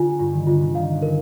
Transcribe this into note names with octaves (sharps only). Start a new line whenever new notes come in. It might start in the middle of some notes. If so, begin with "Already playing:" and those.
Already playing: D3 F4 G#5
G2 F4
D#3
D3 F4
C3
D#3 F5
D3
A#4